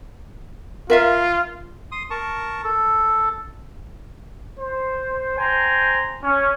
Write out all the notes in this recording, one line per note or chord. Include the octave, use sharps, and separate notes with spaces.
F4 A#4 E5 F5
C6 D#6
A#4 A5 C#6
A4
C5
C5 G5 G#5 A#5 C6
C#4